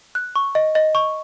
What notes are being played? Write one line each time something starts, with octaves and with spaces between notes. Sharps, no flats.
F#6
C#6
D#5
D#5
C#6